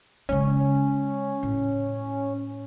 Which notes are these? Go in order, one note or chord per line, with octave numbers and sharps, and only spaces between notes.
C#3 G#3 C#4
A2